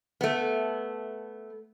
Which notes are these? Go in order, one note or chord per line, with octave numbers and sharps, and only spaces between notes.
A3 B3